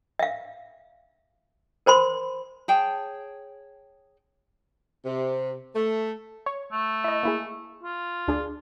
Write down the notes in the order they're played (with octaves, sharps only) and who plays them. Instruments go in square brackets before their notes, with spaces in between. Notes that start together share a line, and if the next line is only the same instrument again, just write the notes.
[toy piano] E5 F5
A#4 C5 B5 C6
[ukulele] G#4 C#5 G5 A5
[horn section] C3
A3
[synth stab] C#5
[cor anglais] A3
[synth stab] E4 D#5
A#3 E4 G#4
[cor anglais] F4
[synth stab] D2 D4 G#4